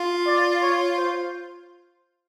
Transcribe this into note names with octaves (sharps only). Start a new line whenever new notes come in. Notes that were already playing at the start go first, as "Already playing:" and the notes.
Already playing: F4
D5
C#5
C5